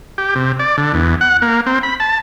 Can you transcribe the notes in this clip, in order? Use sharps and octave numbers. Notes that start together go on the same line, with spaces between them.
G4
C3
D5
D3
E2
F#5
A#3
C4
B5
A5